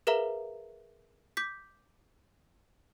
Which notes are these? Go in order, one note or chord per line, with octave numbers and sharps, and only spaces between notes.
G#4 A#4 B4 E5 F5 A#5
D6 G6 B6